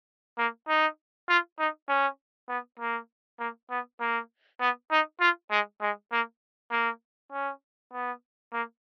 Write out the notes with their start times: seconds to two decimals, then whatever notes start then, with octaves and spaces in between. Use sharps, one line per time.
0.38 A#3
0.68 D#4
1.29 F4
1.59 D#4
1.89 C#4
2.49 B3
2.80 A#3
3.39 A#3
3.70 B3
4.00 A#3
4.60 B3
4.91 D#4
5.20 F4
5.51 G#3
5.81 G#3
6.12 A#3
6.71 A#3
7.32 C#4
7.93 B3
8.53 A#3